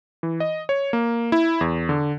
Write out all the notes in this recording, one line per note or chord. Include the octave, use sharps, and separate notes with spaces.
E3
D#5
C#5
A#3
E4
E2
D3